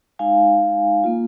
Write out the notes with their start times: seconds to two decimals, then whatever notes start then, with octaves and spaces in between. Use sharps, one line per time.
0.19 G#3 D#4 F5 G#5
1.04 A#3 F4